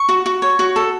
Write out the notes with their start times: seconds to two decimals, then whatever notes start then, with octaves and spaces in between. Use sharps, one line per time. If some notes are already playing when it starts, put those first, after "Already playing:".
Already playing: C#6
0.09 F#4
0.26 F#4
0.42 C#5
0.59 F#4
0.76 A4